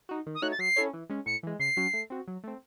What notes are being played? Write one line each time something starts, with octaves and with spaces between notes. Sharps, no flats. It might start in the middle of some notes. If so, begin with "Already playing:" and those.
D#4 F#4
D#3
D#6
A3 D#4 F#4 C#5 F#6
A6
F#3 C7
C#4 E4 A4 C#5
E3
G#3 C#4
A2 C#7
E3 G#3
C#3 C7
F#3 C#4 F#4
A3
C4 F#4
F#3
A3 C4